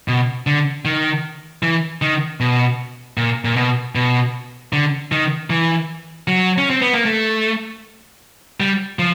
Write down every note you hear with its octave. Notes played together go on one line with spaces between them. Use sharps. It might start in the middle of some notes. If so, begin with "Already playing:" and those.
B2
D3
D#3
E3
D#3
B2
A#2
A#2
B2
B2
D3
D#3
E3
F#3
C#4
C4
B3
A#3
A3
G3
F3